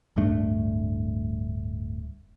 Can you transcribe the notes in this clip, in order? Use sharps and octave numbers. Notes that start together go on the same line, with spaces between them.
D1 G2 A3 D4